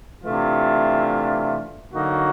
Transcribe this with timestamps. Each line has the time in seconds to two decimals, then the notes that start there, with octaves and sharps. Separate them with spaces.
0.23 C3 E3 A3 D4 F4
1.92 D3 F#3 A#3 D#4 F#4